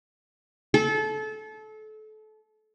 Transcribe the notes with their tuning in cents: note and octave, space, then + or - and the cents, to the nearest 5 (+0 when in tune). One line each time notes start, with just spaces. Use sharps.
A4 -30